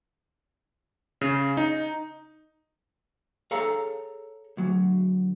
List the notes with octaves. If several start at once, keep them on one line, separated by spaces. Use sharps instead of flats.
C#3
D#4
G#4 A4 C#5 F5 A#5
D2 F#3